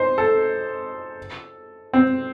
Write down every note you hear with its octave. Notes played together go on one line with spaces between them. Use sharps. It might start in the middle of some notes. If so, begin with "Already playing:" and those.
Already playing: D#4 C5
A4
C4